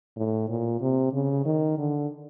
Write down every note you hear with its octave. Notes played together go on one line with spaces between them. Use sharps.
A2
A#2
C3
C#3
D#3
D3